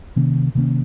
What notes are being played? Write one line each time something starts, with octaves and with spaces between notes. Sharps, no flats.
C3 D#3 A#3 C#4
C3 D#3 A#3 C#4